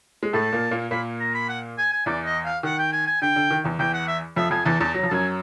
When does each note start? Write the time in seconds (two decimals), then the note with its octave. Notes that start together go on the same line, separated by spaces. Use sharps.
0.23 G#3
0.33 A2 A3 A5
0.52 A#2 A#3
0.71 A#2 A#3
0.91 A#2 A#3 B5
1.20 A#5
1.34 B5
1.49 F#5
1.78 G#5
1.92 G#5
2.06 E2 E3 D5
2.25 D#5
2.45 F5
2.63 D#3 F#5
2.78 G5
2.93 G#5
3.07 G#5
3.21 D3 G5
3.36 D3
3.51 D#3
3.64 E2 E3
3.79 E2 E3 G5
3.94 F#5
4.08 E5
4.36 F2 F3 E5
4.51 F2 F3 G#5
4.65 E2 E3 A5
4.80 E2 E3 A5
4.94 F#3 A#5
5.03 F3
5.09 F#2 F#3 G#5 A5